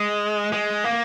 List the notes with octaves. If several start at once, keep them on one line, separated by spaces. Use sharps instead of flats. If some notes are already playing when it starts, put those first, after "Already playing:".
Already playing: G#3
G#3
A#3